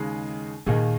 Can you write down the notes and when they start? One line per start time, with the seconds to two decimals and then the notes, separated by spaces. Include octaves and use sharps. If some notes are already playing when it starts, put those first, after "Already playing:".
Already playing: D#2 C#3 G#3 D#4 G#4
0.66 D#2 A#2 D#3 A#3 D#4 G#4